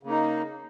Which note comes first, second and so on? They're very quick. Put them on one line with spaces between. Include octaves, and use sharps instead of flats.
C#3 A#3 D#4